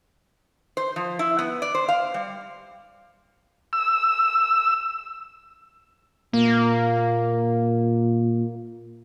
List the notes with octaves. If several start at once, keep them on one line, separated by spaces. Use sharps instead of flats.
C5
F3
E4
B3
D5
C5
F5
G3
E6
A#2 A#3